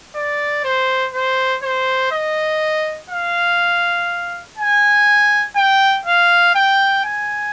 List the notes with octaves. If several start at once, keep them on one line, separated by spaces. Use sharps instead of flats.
D5
C5
C5
C5
D#5
F5
G#5
G5
F5
G5
G#5